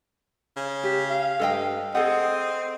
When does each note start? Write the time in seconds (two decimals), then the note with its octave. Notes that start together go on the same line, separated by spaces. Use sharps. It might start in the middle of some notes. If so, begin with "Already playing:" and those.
0.56 C#3
0.84 G4
1.10 F5
1.40 G2 A4 D#5 G5
1.95 C4 G#4 A4 D#5 F#5